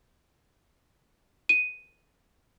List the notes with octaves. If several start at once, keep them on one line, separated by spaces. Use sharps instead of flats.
D#7